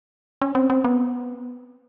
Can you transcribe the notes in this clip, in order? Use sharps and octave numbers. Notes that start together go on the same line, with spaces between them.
C#4
C4
C4
B3